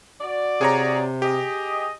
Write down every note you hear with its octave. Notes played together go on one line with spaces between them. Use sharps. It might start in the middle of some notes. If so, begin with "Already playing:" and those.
F#4 D5
C3 G#4 C#5 A#5
G4 G#4 D#5